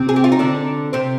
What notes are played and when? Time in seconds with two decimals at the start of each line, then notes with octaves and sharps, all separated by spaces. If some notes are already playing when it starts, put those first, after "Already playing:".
Already playing: C3 C4
0.09 G#4
0.16 G4
0.24 F4
0.32 D#4
0.39 D3 D4
0.93 C3 C4